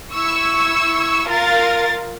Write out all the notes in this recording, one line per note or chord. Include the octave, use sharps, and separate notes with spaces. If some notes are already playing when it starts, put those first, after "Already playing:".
E4 C#6 E6
F4 A#4 F5 A6